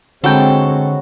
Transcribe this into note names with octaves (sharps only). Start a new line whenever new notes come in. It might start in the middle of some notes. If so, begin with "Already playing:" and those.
D3 F#3 G#3 C4 F#4 A4 G5 B5